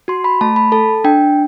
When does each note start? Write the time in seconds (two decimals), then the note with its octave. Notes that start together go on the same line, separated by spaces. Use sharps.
0.08 F#4 C6
0.24 B5
0.41 A3 A5
0.56 B5
0.72 A4 A5
1.04 D4 G5